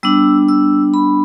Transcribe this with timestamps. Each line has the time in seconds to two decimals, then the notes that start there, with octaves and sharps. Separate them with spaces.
0.03 G3 B3 D4 E6
0.48 E6
0.94 B5